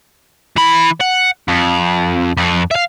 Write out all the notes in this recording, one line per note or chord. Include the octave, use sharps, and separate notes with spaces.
E3 B5
F#5
F2
F2
E5 F5